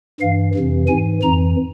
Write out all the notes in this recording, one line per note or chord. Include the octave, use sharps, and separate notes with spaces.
G2 E3 F5
F2 C3 E3
G#2 E3 G#5
F2 E3 A#5